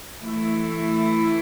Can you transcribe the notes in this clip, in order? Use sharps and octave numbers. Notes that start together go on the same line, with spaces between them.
E3 A3 E4